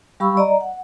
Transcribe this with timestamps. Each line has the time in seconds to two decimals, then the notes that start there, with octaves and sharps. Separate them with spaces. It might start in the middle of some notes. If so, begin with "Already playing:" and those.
0.20 G3 G4 F5 B5 C#6 E6
0.37 D5 D#5 A#5
0.61 F#5